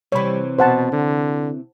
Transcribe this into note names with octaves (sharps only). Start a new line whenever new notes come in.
C3 E3 G3 C#5 B5
B2 C5 F#5 A5
D3